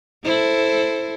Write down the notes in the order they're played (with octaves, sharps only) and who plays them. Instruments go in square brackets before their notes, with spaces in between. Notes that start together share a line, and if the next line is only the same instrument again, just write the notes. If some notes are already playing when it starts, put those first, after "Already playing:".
[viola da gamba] E4 A4 C5